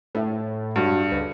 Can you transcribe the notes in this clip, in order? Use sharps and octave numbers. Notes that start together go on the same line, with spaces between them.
A2 A4 E5
G2 F#4 A4
C#2 B4